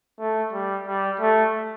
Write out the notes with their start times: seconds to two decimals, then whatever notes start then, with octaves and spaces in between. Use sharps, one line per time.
0.18 A3
0.52 G3
0.87 G3
1.19 A3